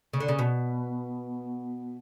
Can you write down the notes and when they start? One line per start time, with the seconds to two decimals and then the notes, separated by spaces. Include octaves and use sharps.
0.13 C#3
0.20 D3
0.28 C#3
0.39 B2